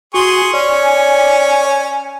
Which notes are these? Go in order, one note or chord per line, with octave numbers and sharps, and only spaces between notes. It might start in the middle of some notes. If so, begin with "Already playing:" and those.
F#4 G#4 G#5 C6 C#6
C#4 C#5 D5